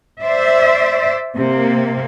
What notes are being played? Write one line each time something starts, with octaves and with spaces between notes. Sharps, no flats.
C5 D5 E5
C3 A#3